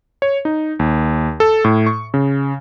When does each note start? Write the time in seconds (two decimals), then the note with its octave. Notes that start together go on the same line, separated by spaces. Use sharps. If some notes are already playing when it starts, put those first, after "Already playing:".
0.22 C#5
0.45 D#4
0.79 D#2
1.40 A4
1.64 A2
1.87 C#6
2.14 C#3